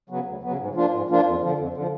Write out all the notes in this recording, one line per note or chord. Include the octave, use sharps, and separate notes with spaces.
C#3 F#3 B3
D2
C#3 F#3 B3
G#2
F3 A#3 D4 F4
G#2
F3 A#3 D4 F4
F2
D3 F3
F2
D3 F3